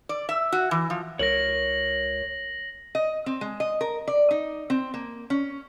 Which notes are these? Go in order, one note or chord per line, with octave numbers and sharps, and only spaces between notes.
D5
E5
F#4
E3
F3
C#2 A#4 C#5 A#6 F#7
D#5
C4
G#3
D#5
A#4
D5
D#4
C4
A#3
C#4